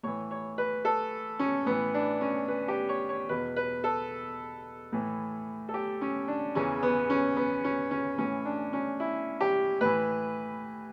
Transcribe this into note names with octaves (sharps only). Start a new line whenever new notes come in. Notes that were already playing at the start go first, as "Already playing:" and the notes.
A2 E3 C#5
C#5
B4
A4
C#4
A2 E3 B3
D4
C#4
B4
G4
C#5
C#5
E2 B2 B4
B4
A4
A2 E3
A4
G4
C#4
D4
E2 C#3 E3 C#4
B3
C#4
B3
C#4
C#4
A2 E3 C#4
D4
C#4
E4
G4
A2 E3 B4